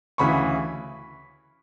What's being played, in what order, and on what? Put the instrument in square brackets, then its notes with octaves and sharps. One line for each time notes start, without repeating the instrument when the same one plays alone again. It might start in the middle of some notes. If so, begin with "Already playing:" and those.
[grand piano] D2 C#3 E3 B5 C#6